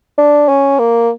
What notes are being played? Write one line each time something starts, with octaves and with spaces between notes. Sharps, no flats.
D4
C#4
A#3